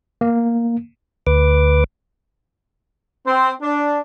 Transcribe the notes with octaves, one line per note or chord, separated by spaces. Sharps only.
A#3
D2 B4 D6
C4
D4